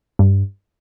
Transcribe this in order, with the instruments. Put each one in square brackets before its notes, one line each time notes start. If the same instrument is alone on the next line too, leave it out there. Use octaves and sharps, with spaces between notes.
[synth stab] G2